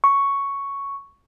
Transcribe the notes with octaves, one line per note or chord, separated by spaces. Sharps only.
C#6